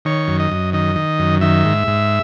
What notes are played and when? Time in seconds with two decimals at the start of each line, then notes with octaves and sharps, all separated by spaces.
0.05 D#3 C#5
0.28 F#2
0.40 D#5
0.51 F#2
0.73 D#3 D#5
0.96 D#3
1.19 F#2
1.41 D#3 E5
1.65 G#2
1.87 G#2